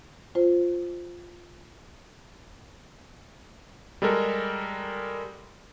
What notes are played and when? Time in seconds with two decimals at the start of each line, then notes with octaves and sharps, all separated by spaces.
0.35 F4 C5
4.02 G3 G#3 A4 A#4